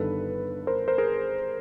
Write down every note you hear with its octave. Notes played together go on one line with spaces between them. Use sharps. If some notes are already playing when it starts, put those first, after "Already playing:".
Already playing: G1 G2 D#3 A4 B4
A#4 C5
A#4 C5
G#4 A#4